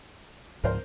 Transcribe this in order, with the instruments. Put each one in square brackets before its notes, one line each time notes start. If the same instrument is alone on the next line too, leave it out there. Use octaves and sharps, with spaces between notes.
[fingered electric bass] C#2 G#2 F3 [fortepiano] A#4 C5